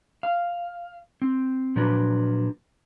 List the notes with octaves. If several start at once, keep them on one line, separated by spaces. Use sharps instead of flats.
F5
C4
A#2 F3 F#3 D4 B4